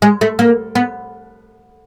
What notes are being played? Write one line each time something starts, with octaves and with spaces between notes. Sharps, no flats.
G#3
A3
A#3
B3